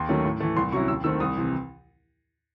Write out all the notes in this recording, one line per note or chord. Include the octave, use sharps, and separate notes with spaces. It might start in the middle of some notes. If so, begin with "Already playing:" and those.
Already playing: D#2 C6
D#3 F#3 A3 C#4
A2
E3 A3
C2 C6
C3 F#3 C#4 E4 C#6
D#2 E6
D#3 A3 C4 E6
C2 D#6
C3 E3